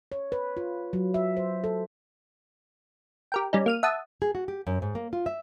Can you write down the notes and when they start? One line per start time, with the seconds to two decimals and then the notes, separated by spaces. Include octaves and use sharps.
0.12 C#5
0.32 B4
0.57 F4
0.93 F#3
1.14 E5
1.37 C5
1.64 A4
3.32 G4 A#4 G5
3.53 G3 C#4 D#4
3.66 A#3 F6 D#7
3.83 E5 F#5 A5 D#6
4.22 G#4
4.35 F#4
4.48 G4
4.67 F#2
4.82 G#2
4.95 A#3
5.13 F4
5.26 E5